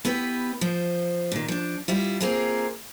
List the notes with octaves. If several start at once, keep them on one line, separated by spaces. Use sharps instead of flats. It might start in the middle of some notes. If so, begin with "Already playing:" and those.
B3 E4 G4 B4
F3 C5
A#2 D#3
F3 D4
G3 E4 F4
A#3 C4 F4 G#4 A#4